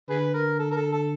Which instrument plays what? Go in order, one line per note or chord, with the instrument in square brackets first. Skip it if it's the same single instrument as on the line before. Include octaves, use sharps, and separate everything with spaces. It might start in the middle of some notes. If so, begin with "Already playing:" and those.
[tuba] D3 [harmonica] G#4 B4
[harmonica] A#4
A4
A#4
A4
A4